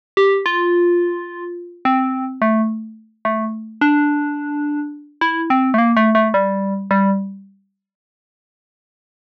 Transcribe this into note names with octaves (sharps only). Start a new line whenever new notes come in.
G4
F4
C4
A3
A3
D4
E4
C4
A3
A#3
A3
A3
G3
G3